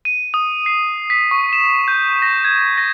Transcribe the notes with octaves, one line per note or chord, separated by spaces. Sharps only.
D#7
D#6
C7
B6
C#6
E7
G6
A#6
G#6
A#6